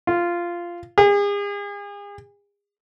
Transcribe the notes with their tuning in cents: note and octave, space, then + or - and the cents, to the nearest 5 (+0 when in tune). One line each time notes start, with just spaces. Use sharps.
F4 -10
G#4 -40